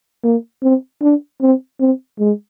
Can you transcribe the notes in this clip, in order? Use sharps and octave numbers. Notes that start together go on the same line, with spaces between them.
A#3
C4
D4
C4
C4
G#3